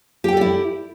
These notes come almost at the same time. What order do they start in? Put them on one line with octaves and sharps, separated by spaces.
G4 G5 A4 D5 E4